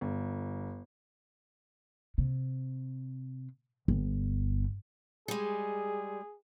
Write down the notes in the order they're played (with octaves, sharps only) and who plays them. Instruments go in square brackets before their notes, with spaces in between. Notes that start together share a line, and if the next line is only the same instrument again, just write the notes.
[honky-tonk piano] G1
[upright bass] C3
G1
[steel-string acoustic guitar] G3 G#3 [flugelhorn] G#4